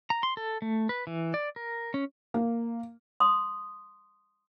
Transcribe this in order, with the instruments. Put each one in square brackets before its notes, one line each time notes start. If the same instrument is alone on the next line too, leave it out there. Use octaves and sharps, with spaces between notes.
[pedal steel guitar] A#5
C6
A4
A3
B4
E3
D5
A#4
C#4
[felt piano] A#3
[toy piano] C6 D#6